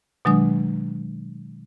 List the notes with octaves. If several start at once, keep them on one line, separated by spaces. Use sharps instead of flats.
B2 D#3 F#3 G#3 D4 D#6